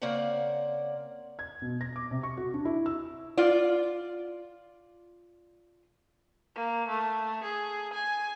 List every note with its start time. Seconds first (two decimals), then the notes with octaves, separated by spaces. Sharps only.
0.02 C#3 A#3 C4 D5 F#5
1.39 G#6
1.62 B2
1.81 A#6
1.96 D6
2.11 C3
2.23 C#6
2.37 F#4
2.54 D4
2.65 E4
2.86 E6
3.37 F4 D5
6.55 A#3
6.88 A3
7.44 G#4
7.93 G#5